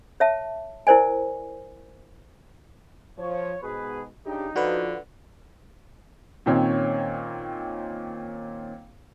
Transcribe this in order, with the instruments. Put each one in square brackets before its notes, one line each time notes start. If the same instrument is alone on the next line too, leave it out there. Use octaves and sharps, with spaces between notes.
[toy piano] C#5 E5 A5
E4 A#4 C5 D5 G#5
[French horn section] F3 [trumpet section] C#5
[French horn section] G#2 B2 [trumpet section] G#4 B4
[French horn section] C#3 D4 G4 [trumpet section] D#4
[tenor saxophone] D3 [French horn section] F3 [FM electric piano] F#4 B4
[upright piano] A#2 D#3 C4 C#4 C#5